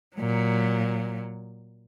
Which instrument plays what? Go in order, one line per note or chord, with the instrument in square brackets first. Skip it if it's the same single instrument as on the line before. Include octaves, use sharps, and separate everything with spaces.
[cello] A#2 F#3